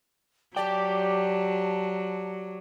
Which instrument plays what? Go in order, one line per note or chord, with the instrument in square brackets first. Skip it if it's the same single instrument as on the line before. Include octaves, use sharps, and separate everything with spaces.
[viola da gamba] F#3 [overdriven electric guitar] G4 G5 [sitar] D5 [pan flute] A5